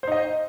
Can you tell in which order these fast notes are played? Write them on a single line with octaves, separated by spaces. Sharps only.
C5 D#4 D#5